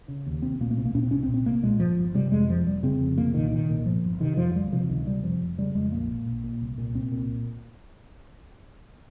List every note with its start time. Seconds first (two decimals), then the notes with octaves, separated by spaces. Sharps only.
0.08 C#3
0.26 D#2
0.42 C2 C4
0.61 A#2 A#3
0.71 A#3
0.77 C2 C4
0.85 A#3
0.95 A#2 C#4
1.03 C4
1.11 C2 C#4
1.23 C4
1.28 A#2
1.34 C4
1.46 C2 A#3
1.63 A#2 G#3
1.80 G1 F3
1.97 G1
2.15 C3 G3
2.31 F2 G#3
2.49 F1 F3
2.67 F1 G3
2.83 C#3 C4
3.00 F2
3.18 C2 A#3
3.34 A#2 D#3
3.52 C2 D#3
3.69 A#2
3.86 G1 F3
4.04 G1
4.20 C3 D#3
4.37 F2 F3
4.55 C#2 G3
4.72 C3 F3
4.89 C#2 D#3
5.06 C3 G3
5.23 F1 F3
5.40 F1
5.58 C#3 G3
5.75 F2 G#3
5.92 A#1 A#3
6.09 A#2
6.26 A#1
6.44 A#2
6.61 C2
6.78 A#2
6.95 C2 C4
7.12 A#2